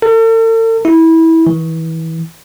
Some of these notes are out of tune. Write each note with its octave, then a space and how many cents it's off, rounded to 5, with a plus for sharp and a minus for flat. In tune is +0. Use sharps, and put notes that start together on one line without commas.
A4 +45
E4 -20
E3 -25